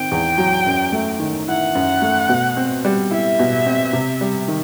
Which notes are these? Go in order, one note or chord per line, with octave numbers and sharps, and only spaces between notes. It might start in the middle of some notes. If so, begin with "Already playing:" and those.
Already playing: D#3 C4 G5
E2
F#3
F#2
A3
D#3
E4 F#5
F#2
A3
B2
C4
G3
E4 E5
B2
C4
C3
G3
D#3